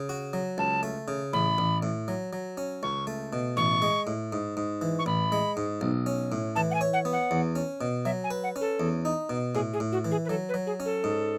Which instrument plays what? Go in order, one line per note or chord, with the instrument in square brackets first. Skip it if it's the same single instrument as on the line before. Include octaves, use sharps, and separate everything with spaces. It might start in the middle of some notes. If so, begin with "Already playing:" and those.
Already playing: [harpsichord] C#3
F#4
F#3
[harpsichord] C#2 [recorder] A5
[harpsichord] A3
C#3
[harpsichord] A1 [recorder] B5
[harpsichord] A1
A2
F#3
F#3
C#4
[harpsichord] C#2 [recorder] C#6
[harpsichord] A3
B2
[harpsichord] A1 [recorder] C#6
[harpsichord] G#3
A2
G#2
G#2
E3
[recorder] C#6
[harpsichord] A1 [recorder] B5
[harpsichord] G#3
G#2
B1
C#4
A2
[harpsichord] E3 [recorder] A5
[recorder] F#5
G#5
[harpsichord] C#5
[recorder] F#5
[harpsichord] B3
[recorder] F#5
[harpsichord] E2
C#4
B2
[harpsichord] F#3 [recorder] E5
[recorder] G#5
[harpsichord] B4
[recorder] F#5
[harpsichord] C#4
[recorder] A4
[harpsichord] E2
D#4
B2
[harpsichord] A2 [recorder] G#4
[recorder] G#4
[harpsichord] A2
[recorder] F#4
[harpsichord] E3
[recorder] G#4
B4
[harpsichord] F#3 [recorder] A4
[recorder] B4
[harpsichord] F#3
[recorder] G#4
[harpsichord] C#4
[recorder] A4
[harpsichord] G#2